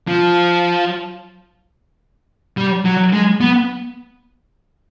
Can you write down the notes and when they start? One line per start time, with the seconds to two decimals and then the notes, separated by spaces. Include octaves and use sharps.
0.08 F3
2.57 G3
2.85 F#3
3.13 G#3
3.41 B3